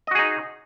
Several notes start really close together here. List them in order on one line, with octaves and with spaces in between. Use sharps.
D#5 F#4 G#4 D#4